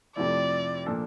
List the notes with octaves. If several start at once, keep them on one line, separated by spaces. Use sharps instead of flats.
F2 C3 F3 A3 E4 D5
A#2 F3 A#3 D4 A4